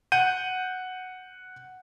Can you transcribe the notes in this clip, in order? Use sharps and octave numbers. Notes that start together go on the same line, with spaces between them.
F#5 G6 D#7